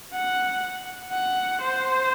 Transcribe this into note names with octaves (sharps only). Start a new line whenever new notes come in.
F#5
F#5
C5